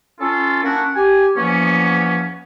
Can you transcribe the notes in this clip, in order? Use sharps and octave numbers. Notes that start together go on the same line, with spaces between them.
C#4 F4 A4
A#3 C#4 D4 E4 F#4
G4 G#5
E2 F3 A#3 B3 C#4